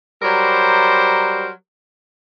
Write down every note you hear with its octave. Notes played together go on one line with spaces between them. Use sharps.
F#3 G3 A#4 C5